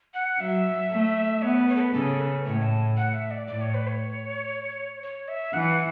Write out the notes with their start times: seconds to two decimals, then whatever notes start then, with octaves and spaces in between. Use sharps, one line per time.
0.14 F#5
0.39 F#3 E5
0.91 A3
1.42 B3 C#5
1.55 B4
1.68 C#5
1.76 A4
1.81 B4
1.93 C#3 A4
2.20 B4
2.45 A2 C#5
2.62 A5
2.97 F#5
3.14 E5
3.31 D5
3.47 A2 D5
3.61 C#5
3.74 B4
3.87 C#5
5.02 C#5
5.28 E5
5.53 E3 F#5